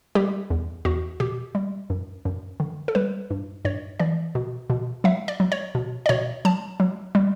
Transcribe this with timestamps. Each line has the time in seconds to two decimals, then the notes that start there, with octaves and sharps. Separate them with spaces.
0.15 G3 G4
0.50 E2
0.85 E2 F#4
1.20 B2 G4
1.55 G3
1.90 F#2
2.25 F#2
2.60 D3
2.88 A4
2.95 G3 B4
3.30 G2
3.65 G2 C#5
4.00 E3 D5
4.35 B2
4.70 B2
5.04 F#3 E5
5.28 D5
5.40 F#3
5.52 C#5
5.75 B2
6.06 D5
6.09 B2 C#5
6.45 F#3 A5
6.80 F#3
7.15 G3